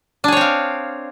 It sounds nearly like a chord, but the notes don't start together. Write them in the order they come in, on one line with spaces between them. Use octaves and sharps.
D4 G#4 C#5 C4 F5